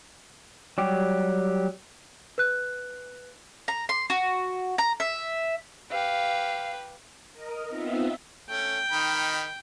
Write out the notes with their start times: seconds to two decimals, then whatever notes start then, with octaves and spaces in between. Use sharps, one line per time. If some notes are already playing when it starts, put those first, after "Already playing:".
0.78 F#3 G3 G4
2.38 B4 F#6
3.68 A#5
3.89 C6
4.10 F#4
4.78 A#5
5.00 E5
5.91 G4 B4 F5
7.33 A#4 D#5
7.67 B3 C4 D#4 F4 E5
8.49 A3 C#4 G5
8.92 D#3 D#4 B5